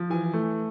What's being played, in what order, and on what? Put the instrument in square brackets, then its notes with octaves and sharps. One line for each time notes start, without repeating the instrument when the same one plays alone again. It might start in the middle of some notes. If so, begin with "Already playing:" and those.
Already playing: [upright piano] F3
E3 G#5
A3